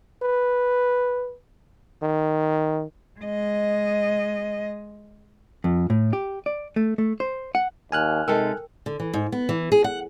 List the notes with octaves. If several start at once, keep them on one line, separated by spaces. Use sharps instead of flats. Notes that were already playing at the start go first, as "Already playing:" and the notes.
B4
D#3
G#3 D#5
F2
A2
G4
D5
A3
A3
C5
F#5
D#2 G#5 F6 F#6
C3 G#3 D#4 A4 A#4 G5 A5
D3
E3
G#2
B3
E3
G#4
F#5